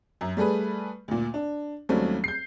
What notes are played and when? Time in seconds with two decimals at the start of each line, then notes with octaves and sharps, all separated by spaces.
0.21 F#2
0.37 G3 A3 G#4 B4
1.08 D2 A#2
1.34 D4
1.89 D#2 F#3 G3 A3 C4 C#4
2.24 G6 C7